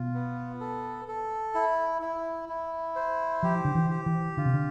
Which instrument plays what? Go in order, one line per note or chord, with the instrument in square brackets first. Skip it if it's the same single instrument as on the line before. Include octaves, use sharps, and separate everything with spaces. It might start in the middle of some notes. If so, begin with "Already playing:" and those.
Already playing: [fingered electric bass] B2 [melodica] F4
[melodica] B3
A4
A4
E4
E4
E4
C5
[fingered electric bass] F3 [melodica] G4
[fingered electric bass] D3
E3
[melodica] G4
[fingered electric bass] E3
[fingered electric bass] D3 [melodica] F4
[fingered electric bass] C3
D3